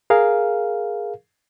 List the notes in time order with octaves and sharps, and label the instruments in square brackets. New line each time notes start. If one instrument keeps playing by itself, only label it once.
[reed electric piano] G#4 A#4 F5